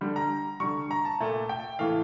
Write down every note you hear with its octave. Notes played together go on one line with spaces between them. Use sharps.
D3 G3
A#5
D3 G3 C#6
A#5
A5
A#2 A3
G5
A2 E3 A3 F5